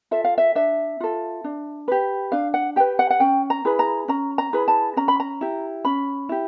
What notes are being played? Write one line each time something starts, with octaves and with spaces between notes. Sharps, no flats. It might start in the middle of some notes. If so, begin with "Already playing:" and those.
F4 A4 E5
F5
E5
D4 E5
F4 A4
D4
G4 B4
D4 F5
F#5
G4 B4 G5
F#5
F#5
C#4 G5
A#5
E4 G#4 B4
A#5
C#4 A#5
A#5
E4 G#4 B4
A5
C#4 A#5
B5
A#5
E4 G4
C#4 B5
E4 G4